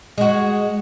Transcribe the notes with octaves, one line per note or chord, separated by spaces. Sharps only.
G#3 F#4